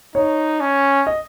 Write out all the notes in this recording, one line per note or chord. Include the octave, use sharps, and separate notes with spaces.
D#4 C#5
C#4
D#5